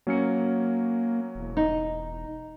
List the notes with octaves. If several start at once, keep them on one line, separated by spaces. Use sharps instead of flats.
F#3 A#3 C#4 C#7
E1
D#4